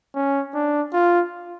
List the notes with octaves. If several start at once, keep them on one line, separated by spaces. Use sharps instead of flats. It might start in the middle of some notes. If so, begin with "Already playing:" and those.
C#4
D4
F4